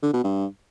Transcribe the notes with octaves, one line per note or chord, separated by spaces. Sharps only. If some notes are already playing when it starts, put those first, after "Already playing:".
D3
B2
G2